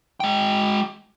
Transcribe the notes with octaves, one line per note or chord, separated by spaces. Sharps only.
G#3 G5